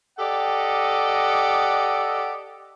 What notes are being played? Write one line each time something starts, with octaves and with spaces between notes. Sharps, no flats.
G4 A4 D5 D#5 F#5